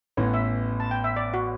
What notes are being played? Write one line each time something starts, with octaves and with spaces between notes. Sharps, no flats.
A1 A2 E3 B3 C#5
E5
A5
G5
E5
D5
F#4